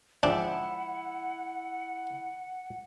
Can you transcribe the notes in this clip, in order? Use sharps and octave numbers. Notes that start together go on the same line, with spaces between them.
G#2 F3 D4 E4 F#5 G5